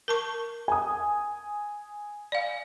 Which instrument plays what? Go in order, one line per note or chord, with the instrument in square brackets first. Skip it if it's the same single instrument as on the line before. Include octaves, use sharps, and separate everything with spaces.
[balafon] A#4 A5 C#6
[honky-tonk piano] G#5 D#6
[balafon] D5 F5